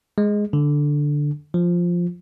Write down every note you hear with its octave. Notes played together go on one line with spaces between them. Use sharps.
G#3
D3
F3